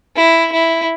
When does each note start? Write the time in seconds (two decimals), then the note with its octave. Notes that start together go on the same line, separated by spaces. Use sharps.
0.16 E4
0.52 E4